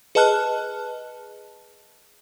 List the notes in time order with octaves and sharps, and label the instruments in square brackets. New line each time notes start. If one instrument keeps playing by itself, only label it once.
[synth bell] G#4 B4 D#5 A5 F6 F#6